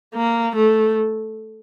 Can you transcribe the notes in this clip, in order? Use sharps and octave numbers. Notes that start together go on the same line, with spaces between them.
A#3
A3